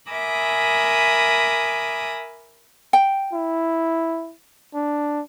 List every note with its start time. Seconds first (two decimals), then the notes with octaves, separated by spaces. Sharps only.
0.11 A#4 E5 G#5 B5 D6 D#6
2.93 G5
3.33 E4
4.74 D4